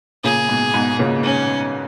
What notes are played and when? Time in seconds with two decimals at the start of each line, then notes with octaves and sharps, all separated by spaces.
0.24 A#2 C#3 G#4
0.49 G#2 B2
0.74 G#2 B2
0.99 A#2 C#3
1.24 C#4